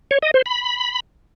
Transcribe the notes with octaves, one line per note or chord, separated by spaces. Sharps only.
C#5
D#5
C5
B5